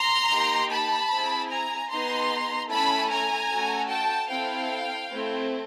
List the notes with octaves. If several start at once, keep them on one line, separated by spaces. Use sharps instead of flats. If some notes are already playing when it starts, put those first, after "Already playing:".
Already playing: A#5 C6
A#3 D#4 G4
A5 B5
C4 E4 G#4
G#5 A#5
B3 D#4 G#4 A#5 C6
A3 C#4 E4 A4 A5 B5
G#5 A#5
A3 C#4 F#4 A4
G5 A5
C4 E4 A4 F5 G5
A3 C4 E4